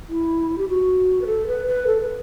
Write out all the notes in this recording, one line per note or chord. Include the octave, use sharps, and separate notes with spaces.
E4
G4
F#4
B4
A4
B4
B4
A4
B4